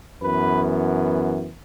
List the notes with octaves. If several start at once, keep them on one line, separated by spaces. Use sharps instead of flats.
F#2 E3 B3 B4